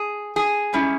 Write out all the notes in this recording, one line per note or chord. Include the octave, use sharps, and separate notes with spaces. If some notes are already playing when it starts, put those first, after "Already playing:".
Already playing: G#4
G#4
G#2 G3 C#4 E4